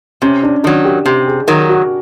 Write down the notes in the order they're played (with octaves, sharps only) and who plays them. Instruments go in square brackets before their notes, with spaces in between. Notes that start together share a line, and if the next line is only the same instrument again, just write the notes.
[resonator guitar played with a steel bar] C3 [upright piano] C#4
[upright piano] D4
[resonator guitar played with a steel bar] D#3 F#3 [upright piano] D4
[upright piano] G4
[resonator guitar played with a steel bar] C3 [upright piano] G4
[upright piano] G#4
[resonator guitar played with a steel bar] D#3 F#3 [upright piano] A#4
[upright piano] F#4